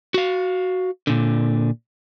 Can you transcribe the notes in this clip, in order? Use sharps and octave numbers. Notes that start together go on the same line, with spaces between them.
F#4 F5
A#2 D3